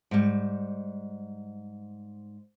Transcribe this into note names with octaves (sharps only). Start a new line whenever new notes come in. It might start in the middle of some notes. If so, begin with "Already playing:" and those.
G#2 G3